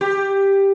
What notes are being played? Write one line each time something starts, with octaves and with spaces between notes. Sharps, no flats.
G4